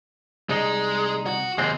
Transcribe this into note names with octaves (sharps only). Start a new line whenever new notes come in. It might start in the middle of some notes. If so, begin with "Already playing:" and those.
C2 G#3 D#4
F#4
D#2 C3 G#3 C4